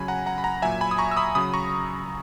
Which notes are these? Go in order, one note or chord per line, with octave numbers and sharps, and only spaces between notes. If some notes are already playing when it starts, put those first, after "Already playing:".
Already playing: C#3 F#3 G#5 B5
F#5 A#5
F#5 A#5
B5
F#5 A#5
A#2 F#3 E5 G#5
G#5 B5
D#6
A#5 C#6
E6
B5 D#6
C#3 F#3 B5 D#6
A#5 C#6